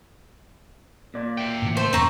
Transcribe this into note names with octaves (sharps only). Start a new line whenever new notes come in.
A#2 D5
E5 G5
A2 C#3 E3
C5 E5 A5
E1 F#2 C4 C#4 A#5 C6 C#6